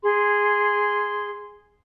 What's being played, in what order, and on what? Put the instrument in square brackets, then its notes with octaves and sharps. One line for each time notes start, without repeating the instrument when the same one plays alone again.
[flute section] G#4 C6